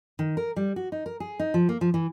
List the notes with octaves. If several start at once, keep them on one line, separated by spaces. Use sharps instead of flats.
D#3
A#4
G3
F#4
D#4
A#4
G#4
D#4
F3
A#3
F3
E3